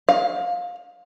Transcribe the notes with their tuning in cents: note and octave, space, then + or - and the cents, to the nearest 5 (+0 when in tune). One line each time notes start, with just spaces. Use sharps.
F5 +25